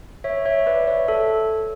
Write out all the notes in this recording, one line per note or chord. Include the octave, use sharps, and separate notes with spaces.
C#5 E5
C#5 E5
B4 D5
C#5 E5
A4 C#5